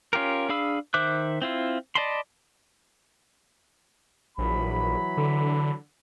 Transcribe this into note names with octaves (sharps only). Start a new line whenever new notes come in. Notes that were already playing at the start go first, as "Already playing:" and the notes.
C#4 F4 G4 A#4
D4 G#4 F5 B5 E6
D#3 C5 E5 D6 F#6
C4 E4 F4
D5 D#5 A5 B5 C6
A#1 E3 F#3 B5
D3